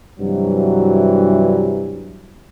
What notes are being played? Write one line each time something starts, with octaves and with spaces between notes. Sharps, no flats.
G2 C3 E3 F#3